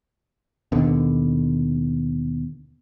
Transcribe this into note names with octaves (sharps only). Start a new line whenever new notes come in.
D#2 B2 D3